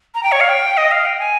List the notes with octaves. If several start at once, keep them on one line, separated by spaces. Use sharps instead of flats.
A#5
G5
C#5
F5
G5
D#5
F5
G5
G#5